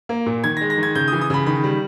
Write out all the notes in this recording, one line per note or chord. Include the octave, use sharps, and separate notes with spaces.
A#3
A#2
D#3 G#6
G#3 A#6
A#6
D#3
G#6
C#3 G6
D#6
E3
D#6
C#3 B5
D#3 B5
G3